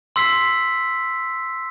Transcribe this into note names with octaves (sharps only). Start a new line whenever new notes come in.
C6 E6 B6 C7